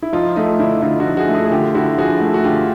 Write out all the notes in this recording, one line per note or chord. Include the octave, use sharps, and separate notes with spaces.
E4
F3 D#4 F4
A3 D#4 F4
D3 D4 E4
D3 D#4 F4
E4 F#4
F3
F#4 G#4
A3
F#4 G#4
G#4
D3 F4 G4
D3 E4 F#4
F3 F#4 G#4
A3
F#4
D3 F4 G4